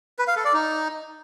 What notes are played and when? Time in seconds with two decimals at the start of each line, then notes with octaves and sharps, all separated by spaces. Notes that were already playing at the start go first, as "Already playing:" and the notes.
0.19 B4
0.28 F5
0.36 A4
0.45 D5
0.53 D#4